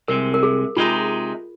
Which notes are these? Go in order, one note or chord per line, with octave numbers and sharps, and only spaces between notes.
C2 C3 G#3 A#4
A#4
G#4
C3 G#3 D#4 F4